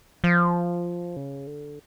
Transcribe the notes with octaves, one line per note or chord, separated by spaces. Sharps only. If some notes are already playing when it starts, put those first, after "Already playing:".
F3
C#3
D3